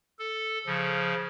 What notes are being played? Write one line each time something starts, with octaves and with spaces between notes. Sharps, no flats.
A4
C#3 F3